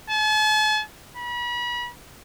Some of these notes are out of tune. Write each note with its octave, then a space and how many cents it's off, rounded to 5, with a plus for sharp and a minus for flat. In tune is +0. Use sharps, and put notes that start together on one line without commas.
A5 -45
B5 -35